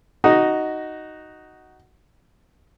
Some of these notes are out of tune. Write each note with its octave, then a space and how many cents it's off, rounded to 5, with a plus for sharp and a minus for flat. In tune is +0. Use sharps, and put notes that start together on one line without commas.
D#4 +0 F#4 +10 D#5 +0